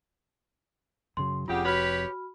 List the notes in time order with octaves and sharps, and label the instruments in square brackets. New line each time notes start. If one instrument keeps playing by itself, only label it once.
[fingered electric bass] F#2 C#3 F#3 [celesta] C6
[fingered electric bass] F1 F2 [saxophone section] C#3 G4 [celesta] F4 F#5
[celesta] F#4 B5 F6 [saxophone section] G4 B4 C#5